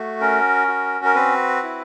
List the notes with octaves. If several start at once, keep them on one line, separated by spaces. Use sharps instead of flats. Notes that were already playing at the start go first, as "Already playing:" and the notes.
Already playing: A3 F#4
C#4 A#4
F#4
A#4
C4 B4
E4